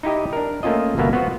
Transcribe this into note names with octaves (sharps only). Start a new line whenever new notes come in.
D#4 E4 G4 D#5
D4 A#4
A3 A#3 C#4 F4 D#5
G1 B2 A#3 B3 E5 F5
B3 F4 F#4 C5